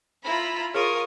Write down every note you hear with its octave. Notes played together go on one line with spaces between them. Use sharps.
E4 F4 A#5 B5
F4 G#4 A#4 C#5 D#6